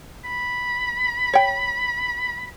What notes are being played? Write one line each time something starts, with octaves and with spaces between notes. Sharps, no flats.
B5
C#5 G5